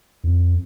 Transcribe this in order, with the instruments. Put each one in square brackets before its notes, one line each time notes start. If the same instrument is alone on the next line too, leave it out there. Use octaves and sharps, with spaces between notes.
[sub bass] F2